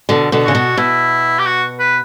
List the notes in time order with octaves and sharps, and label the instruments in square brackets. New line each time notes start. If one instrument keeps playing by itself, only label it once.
[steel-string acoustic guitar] B2 D3
B2 D3
[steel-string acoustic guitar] C#3 [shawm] F#4
[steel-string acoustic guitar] B2
[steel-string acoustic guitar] B2 [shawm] E4
[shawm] G4
F#4
B4